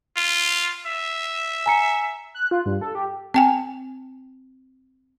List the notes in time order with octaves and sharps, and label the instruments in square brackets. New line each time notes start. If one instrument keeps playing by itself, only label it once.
[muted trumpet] F4
E5
[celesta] G#5 A#5 C#7
[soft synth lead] F#6
F4
G2
A4
G4
[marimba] C4 G5 G#5